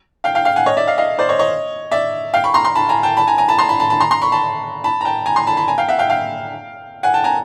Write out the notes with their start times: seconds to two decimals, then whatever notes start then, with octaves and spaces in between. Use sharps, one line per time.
0.24 F5 G5
0.35 F5 G5
0.45 F5 G5
0.56 F#5 G#5
0.66 C#5 D#5
0.77 D5 E5
0.87 D#5 F5
0.98 D#5 F5
1.19 C5 D5
1.29 C#5 D#5
1.39 C#5 D#5
1.91 D5 E5
2.34 F5 G5
2.44 B5 C#6
2.54 A#5 C6
2.65 A#5 C6
2.75 A5 B5
2.89 G#5 A#5
3.03 G5 A5
3.17 A5 B5
3.27 G#5 A#5
3.38 G#5 A#5
3.48 A5 B5
3.58 A#5 C6
3.69 A5 B5
3.80 A5 B5
3.90 A5 B5
4.00 A#5 C6
4.11 A#5 C6
4.22 B5 C#6
4.32 A5 B5
4.84 A5 B5
5.01 A#5
5.05 G5 A5
5.26 G#5 A#5
5.36 A#5 C6
5.47 A5 B5
5.57 A5 B5
5.68 G#5 A#5
5.78 F5 G5
5.88 E5 F#5
5.99 F5 G5
6.09 F5 G5
7.03 F#5 G#5
7.14 G5 A5
7.24 G#5 A#5